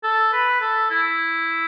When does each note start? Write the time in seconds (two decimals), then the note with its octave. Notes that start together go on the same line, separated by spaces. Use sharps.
0.03 A4
0.33 B4
0.61 A4
0.90 E4